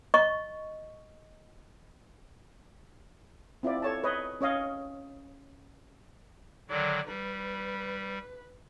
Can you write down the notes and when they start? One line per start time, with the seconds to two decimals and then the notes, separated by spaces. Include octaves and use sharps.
0.14 D#5 C#6
3.63 C4 E4 F4 D5
3.82 A4 C#5 A5
4.04 B4 C#5 D#5
4.41 C#4 C#5 D#5 F5
6.69 D3 D#3 F#3 D5
7.07 G3 B4